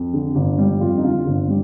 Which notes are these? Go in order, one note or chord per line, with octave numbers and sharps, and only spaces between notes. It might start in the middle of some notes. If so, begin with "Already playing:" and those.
Already playing: F2
D3
G1
G3
F2 F4
D#4
D3 F4
G1
G3